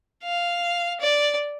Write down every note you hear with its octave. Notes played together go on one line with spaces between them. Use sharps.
F5
D5